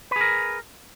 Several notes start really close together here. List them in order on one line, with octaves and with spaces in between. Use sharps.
B4 G#4 A#4